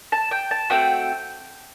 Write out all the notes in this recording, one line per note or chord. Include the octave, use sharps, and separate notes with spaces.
A5
G5
A5
A3 C4 F#4 G5